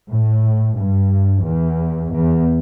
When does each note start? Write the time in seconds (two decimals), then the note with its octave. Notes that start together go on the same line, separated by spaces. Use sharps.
0.11 A2
0.78 G2
1.46 E2
2.14 E2